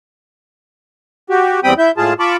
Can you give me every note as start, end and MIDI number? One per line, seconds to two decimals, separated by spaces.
1.30 1.60 66
1.30 1.60 67
1.64 1.74 40
1.64 1.74 55
1.64 1.74 60
1.64 1.74 79
1.64 1.74 83
1.64 1.74 87
1.78 1.92 64
1.78 1.92 76
1.78 1.92 91
1.97 2.14 45
1.97 2.14 56
1.97 2.14 65
1.97 2.14 68
1.97 2.14 81
2.19 2.37 65
2.19 2.37 81
2.19 2.37 83
2.19 2.37 85
2.19 2.37 86